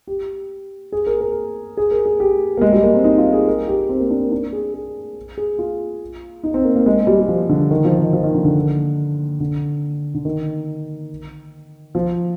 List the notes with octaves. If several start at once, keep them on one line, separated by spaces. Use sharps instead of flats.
G4
G#4
A#4
A#4
G#4
A#4
G#4
G4
A#3
G#3
G3
A#3
C4
D#4
F4
G#4
A#4
G4
C4
A#3
D4
A#4
D4
G#4
G#4
G#4
F4
D#4
C4
A#3
A#3
G#3
G3
G3
F3
D3
D#3
F3
D#3
F3
D#3
D3
D3
D3
D3
D#3
F3